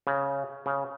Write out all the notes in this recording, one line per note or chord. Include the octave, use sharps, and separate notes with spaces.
C#3
C#3